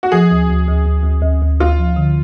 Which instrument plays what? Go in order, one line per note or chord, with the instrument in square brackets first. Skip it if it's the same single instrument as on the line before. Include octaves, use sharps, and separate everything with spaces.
[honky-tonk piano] F#4
[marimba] F3 [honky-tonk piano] G#4
[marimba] D2
D2
D2
D2
D2
D2
D2
[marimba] D2 [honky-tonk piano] F4
[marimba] F3
D3